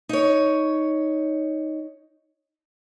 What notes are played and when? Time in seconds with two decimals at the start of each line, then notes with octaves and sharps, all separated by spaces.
0.09 D#4 C#5